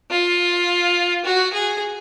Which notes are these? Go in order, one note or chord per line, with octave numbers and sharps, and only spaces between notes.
F4
F#4
G#4